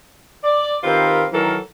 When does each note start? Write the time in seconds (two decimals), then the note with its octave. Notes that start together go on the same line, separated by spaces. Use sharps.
0.44 D5
0.83 D#3 C4 F4 G4 A#4 B4
1.33 D#3 E3 F#3 A4 A#4